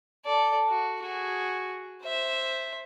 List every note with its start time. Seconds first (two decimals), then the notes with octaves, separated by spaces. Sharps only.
0.26 A4 D5
0.69 F#4
1.03 F#4 G#4
2.03 C5 E5